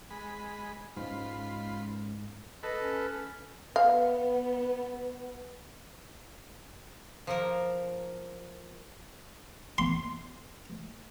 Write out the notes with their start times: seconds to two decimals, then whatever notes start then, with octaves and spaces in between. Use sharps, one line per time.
0.10 G#3 B5
0.97 G#2 G#3 C#4 F4 B5 C6
2.63 A4 B4 D#5
2.80 C#4
3.76 B3 F5
7.27 F3 A#3 A#4
9.78 C6